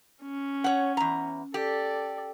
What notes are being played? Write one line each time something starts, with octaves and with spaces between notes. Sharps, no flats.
C#4
C#5 F#5
E2 A#5
G4 A4 D5